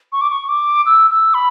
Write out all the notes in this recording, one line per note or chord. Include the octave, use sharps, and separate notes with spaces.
C#6
D6
C#6
D6
E6
E6
B5